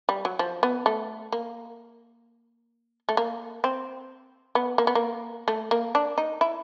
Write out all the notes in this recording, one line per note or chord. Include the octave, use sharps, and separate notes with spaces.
G3
F#3
F3
B3
A3
A#3
A3
A#3
C4
B3
A#3
B3
A#3
A3
A#3
D4
D#4
E4